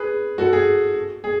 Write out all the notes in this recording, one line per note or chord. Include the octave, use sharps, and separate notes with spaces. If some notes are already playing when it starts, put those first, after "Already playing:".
Already playing: G#4 B4
F#4 A4
G#4
G#4